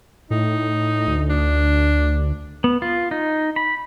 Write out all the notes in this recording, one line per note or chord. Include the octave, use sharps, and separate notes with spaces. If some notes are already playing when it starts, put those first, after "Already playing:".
A2 D#4
D2
D4
B3
F4
D#4
B5